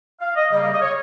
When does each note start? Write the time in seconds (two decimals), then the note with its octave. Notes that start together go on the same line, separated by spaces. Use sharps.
0.21 F5
0.35 D#5
0.51 C#3 G3 A#3 D#5
0.64 F5
0.73 D#5
0.81 C#5